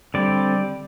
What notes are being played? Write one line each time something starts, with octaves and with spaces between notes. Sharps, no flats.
D3 G3 C4 D5